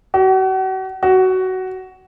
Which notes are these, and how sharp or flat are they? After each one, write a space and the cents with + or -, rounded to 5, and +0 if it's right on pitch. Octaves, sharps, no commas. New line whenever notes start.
F#4 +40
F#4 +15